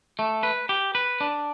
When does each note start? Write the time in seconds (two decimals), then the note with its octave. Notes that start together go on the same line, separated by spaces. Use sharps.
0.19 A3
0.43 B4
0.69 G4
0.95 B4
1.21 D4